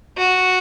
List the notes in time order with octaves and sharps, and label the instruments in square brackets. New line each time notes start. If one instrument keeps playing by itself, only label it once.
[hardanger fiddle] F#4